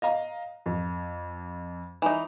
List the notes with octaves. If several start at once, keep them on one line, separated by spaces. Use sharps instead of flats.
D#5 F5 A#5
F2
E3 D#4